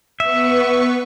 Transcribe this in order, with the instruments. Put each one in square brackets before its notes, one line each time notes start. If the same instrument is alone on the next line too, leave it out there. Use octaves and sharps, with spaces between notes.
[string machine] B3 B4 C#6 [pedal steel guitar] E5